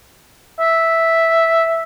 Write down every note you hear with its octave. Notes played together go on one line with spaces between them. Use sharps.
E5